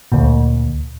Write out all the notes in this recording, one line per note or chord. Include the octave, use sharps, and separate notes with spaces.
D2 A#2